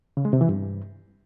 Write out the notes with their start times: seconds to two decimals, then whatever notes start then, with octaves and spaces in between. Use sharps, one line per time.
0.17 C#3
0.25 G#3
0.33 C3
0.41 E3
0.49 G2